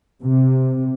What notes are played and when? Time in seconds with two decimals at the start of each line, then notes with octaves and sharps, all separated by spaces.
0.23 C3